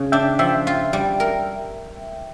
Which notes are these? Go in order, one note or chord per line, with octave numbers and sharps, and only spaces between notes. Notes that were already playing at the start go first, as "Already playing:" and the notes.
Already playing: C#3
D4 E5 G5
F3 E5 G5
F4
G3
A#4